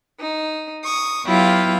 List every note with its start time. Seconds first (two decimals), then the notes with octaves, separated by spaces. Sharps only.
0.20 D#4
0.84 C#6 D#6
1.26 F#3 B3 E4 F4 G4 F5